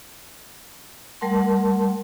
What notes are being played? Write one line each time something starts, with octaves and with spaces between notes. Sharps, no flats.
G3 A3 A#4 F#5 A5 C6